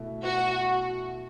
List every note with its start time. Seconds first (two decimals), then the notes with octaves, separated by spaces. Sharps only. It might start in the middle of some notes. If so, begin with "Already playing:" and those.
Already playing: B2 A3 E4
0.24 F#4